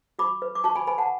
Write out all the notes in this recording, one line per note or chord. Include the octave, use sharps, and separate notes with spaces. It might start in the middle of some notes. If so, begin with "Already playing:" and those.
F#4 B5 D6
B4
D6
F#4 A5 C#6
G#5 B5
B4 G#5 B5
F#5 A5